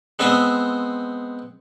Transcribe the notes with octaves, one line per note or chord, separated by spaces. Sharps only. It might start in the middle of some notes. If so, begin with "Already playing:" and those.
G#3 B3 C4 C5 E5 D#6